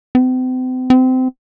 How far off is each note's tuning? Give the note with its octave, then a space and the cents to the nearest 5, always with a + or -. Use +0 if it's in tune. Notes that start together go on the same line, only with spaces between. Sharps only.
C4 -40
C4 -25